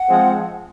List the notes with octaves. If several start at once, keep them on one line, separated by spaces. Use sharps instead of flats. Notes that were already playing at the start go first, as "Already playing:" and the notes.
Already playing: F#5
F3 G#3 C4 G#4